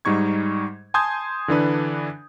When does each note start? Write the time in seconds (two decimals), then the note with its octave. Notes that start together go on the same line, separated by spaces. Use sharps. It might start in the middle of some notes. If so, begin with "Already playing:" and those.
0.05 G#2 G3 D#4 C#6 G#6
0.94 G#5 A5 C6 D#6 G6 G#6
1.48 D3 E3 D4 B4